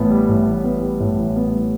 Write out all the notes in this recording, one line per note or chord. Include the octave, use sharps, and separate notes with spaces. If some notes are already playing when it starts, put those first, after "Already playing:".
Already playing: A1 A2 B3
G3
A2
A1
B3
G3
A2
A1
B3
G3